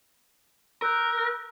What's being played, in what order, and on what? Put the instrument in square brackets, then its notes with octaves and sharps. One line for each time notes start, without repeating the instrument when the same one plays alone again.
[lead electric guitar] A#4 [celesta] E6 F#6 G6